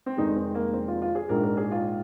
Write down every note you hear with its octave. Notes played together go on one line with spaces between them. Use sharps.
C4
F1 F2 D#3 G#3 D#4
C4
A#3
C4
F4
F4
G#4
A#1 G#2 F3 G#3 A#4
A#4
G#4
F4